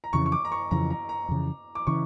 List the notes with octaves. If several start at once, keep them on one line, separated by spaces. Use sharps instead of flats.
A#5
F2 C#3 E3 C#6
C#6
D6
A#5
C#6
F2 C#3 E3 A#5
A#5
A#5
F2 C#3 E3
D6
C#3 E3 C#6